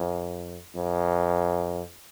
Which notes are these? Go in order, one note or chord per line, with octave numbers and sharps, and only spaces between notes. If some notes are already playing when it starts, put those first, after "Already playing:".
Already playing: F2
F2